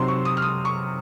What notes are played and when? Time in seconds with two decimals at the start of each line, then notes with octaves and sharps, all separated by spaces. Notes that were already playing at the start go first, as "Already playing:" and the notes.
Already playing: C3 F#3 C4 D#4 C6
0.08 C#6
0.25 D#6
0.37 F6
0.42 D#6
0.65 C#6